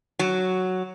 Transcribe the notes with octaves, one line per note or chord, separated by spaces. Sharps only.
F#3